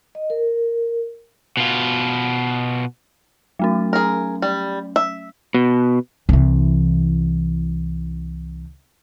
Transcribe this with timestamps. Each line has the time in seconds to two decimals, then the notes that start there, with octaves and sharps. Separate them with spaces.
0.15 D#5
0.30 A#4
1.57 B2 F4
3.59 F#3 A3 C#4
3.93 G#4 A#4
4.42 G3
4.96 E5
5.54 B2
6.29 C2 E3